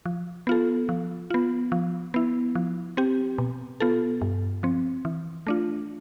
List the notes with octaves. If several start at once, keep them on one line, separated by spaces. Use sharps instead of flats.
F3
B3 F4 A4
F3
B3 F4
F3
B3 E4
F3
C4 G4
B2
B3 F4 A4
G2
F3 C4
E3
A3 D4 F4